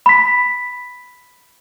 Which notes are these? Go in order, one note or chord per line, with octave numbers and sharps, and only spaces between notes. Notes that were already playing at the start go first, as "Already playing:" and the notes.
B5 B6